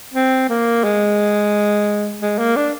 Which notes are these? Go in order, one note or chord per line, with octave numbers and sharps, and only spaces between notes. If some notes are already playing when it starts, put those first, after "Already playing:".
C4
A#3
G#3
G#3
A#3
D4